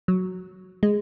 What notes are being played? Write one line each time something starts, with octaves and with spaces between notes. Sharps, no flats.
F#3
G#3